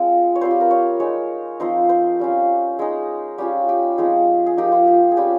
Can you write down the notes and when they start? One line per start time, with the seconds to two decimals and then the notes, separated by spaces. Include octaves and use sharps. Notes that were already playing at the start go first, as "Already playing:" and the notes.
Already playing: G#3 C4 F4
0.35 C#5
0.41 G3 C4 F4 C5
0.51 G4
0.61 A#4
0.71 C#5
1.00 G#3 D#4 C#5
1.60 F3 C4 D#4 C5
1.89 C5
2.19 G3 C#4 F4
2.79 G#3 D#4 G#4
3.38 G3 C#4 F4 G4
3.69 G4
3.98 F3 G#3 C4 D#4 G#4
4.46 G#4
4.57 F3 A#3 D#4 G4
4.72 F4
4.88 G4
5.11 G#4
5.17 G3 C#4 F4 G4